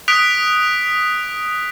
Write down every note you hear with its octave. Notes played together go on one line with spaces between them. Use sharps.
D#6 F#6 B6 D7 F7